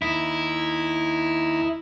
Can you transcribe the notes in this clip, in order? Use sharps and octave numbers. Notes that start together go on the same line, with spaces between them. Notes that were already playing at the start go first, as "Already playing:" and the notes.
D#2 D#4 E4